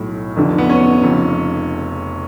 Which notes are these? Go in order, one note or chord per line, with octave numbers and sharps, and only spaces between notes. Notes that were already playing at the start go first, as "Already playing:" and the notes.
Already playing: B1 A2
F1 F2 D3
B3
C#4
F1 F2 C#3